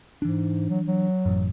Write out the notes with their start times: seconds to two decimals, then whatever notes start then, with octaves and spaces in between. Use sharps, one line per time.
0.22 G#2 E3 D4
0.69 F#3
0.86 F#3
1.25 A1 F#2